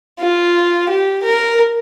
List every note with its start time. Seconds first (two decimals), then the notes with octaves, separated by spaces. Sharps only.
0.19 F4
0.89 G4
1.24 A#4